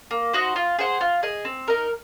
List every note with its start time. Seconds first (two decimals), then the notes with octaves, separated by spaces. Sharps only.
0.11 A#3
0.33 D#4 F#4 C5
0.56 F4
0.79 G#4 C5 F#5
1.01 F4
1.23 G#4 D#5
1.45 C4
1.68 D#4 A#4